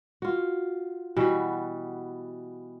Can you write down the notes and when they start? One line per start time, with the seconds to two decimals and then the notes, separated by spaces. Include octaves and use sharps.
0.22 F4 F#4
1.16 B2 E3 G3 F#4